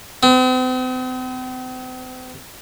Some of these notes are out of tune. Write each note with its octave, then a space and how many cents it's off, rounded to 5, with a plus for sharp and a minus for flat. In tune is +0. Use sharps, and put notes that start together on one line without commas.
C4 -45